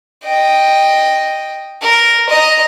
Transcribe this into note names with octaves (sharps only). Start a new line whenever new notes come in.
D#5 G5
A#4
D#5 A#5